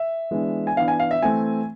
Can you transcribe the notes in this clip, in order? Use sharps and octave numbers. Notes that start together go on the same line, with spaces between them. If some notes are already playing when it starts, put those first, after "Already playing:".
Already playing: E5
E3 G#3 B3 D4
G#5
E3 B3 D4 F5
G#5
F5
E5
E3 A3 C4 G#5